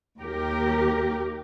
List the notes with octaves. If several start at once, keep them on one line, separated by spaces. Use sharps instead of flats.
D#2 G4 A#4